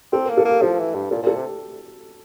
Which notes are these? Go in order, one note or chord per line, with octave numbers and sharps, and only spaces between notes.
C4 A4
A#4
A#3
A4
A#3 G4
F3 A4
E3
G2
A#2 A4
A#2 A4
C3 G4